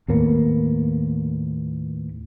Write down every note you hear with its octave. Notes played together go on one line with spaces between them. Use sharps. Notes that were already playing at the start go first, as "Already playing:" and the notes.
D#2 A2 A#3 B3